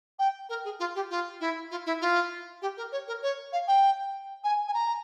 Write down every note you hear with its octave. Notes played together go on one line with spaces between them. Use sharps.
G5
A#4
G#4
F4
G4
F4
E4
F4
E4
F4
G4
A#4
C#5
A#4
C#5
F5
G5
G#5
G#5
A#5